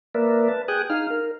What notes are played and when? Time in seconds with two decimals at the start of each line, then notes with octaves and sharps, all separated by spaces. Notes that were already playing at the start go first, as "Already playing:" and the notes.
0.14 A#3 A#4 B4 D5 E5
0.48 B4 A5
0.68 G#4 G5 G#5 D#6 F#6
0.90 D#4 F5 F6
1.10 A#4